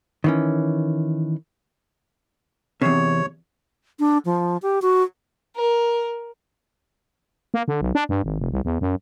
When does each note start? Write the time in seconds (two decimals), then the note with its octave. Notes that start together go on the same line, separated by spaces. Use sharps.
0.24 D#3 E3 C#4
2.82 E2 C3 C#5
3.99 D4
4.25 F3
4.62 G4
4.82 F#4
5.56 A#4
7.54 A#3
7.68 D3
7.81 B1
7.95 D4
8.09 G2
8.24 G#1
8.39 F1
8.52 C2
8.65 E2
8.81 F#2